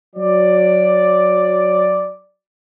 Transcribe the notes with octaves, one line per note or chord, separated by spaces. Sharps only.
F#3 D5